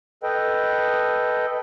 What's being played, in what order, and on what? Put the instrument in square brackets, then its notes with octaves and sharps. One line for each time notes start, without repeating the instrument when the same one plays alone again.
[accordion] A4 B4 D#5 G5